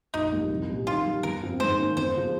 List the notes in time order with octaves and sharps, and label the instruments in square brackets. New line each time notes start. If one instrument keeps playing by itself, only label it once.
[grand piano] A#1 [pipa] D#4
[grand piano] G#2 G3 A#3
C2
A#2 G3 C#4 G4
[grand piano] D#3 [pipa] F4
[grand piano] G3 A#3
[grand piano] G1 [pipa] A#4
[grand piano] G2 F3 C4
[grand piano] G#2 [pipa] C5
[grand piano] D#3 A#3 C#4
[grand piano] G1 [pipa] C5
[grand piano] C#3 F3